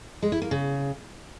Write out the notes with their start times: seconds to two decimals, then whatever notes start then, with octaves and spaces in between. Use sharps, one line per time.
0.22 G#3
0.32 E4
0.42 A#3
0.51 C#3